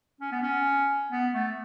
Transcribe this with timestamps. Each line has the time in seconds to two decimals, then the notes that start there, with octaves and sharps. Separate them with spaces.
0.21 C#4
0.32 B3
0.42 C#4
1.12 B3
1.34 A3